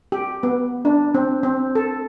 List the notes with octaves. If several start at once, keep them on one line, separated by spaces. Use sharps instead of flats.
G4
B3
D4
C4
C4
A4